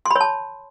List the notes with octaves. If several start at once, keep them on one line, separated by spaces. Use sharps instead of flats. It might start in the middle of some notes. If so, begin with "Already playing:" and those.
C6
B5
C#5
A5